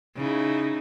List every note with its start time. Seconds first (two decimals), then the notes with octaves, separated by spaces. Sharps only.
0.15 C#3 D#4 E4